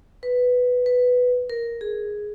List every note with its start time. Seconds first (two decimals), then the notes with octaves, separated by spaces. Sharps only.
0.23 B4
0.86 B4
1.50 A#4
1.81 G#4